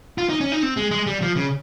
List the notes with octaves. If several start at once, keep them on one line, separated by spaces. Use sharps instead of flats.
F4
D#4
C#4
D#4
C4
G#3
G#3
G3
F3
C#3